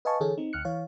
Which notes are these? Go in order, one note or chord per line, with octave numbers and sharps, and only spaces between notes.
B4 D#5 F5 G#5 A5 C#6
D3 E3 G#4 A4 C#5
C4 D#4
D2 F6 F#6 C#7
E3 C#5 F5